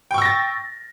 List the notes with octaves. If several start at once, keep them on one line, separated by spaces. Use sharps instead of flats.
G5 C#6 E6 A6 A#6